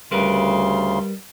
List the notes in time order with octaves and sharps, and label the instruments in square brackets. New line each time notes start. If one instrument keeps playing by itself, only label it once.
[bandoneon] D2 C#3 C6 [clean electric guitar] G3 A#4 B4